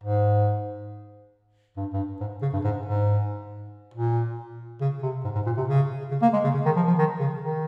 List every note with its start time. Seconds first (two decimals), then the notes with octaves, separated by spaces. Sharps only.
0.03 G#2
1.77 G2
1.93 G2
2.20 G#2
2.42 C#3
2.53 G2
2.64 G#2
2.86 G#2
3.94 A#2
4.81 C#3
5.03 C3
5.24 G#2
5.35 G#2
5.46 A#2
5.57 C3
5.68 C#3
6.11 C#3
6.22 A#3
6.33 G#3
6.44 C#3
6.54 C#3
6.66 D#3
6.76 F3
6.87 F3
6.98 D#3
7.19 C#3
7.42 D#3